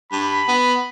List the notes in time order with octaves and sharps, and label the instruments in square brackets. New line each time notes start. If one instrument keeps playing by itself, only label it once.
[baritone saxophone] G2 [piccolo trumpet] B5
[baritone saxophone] B3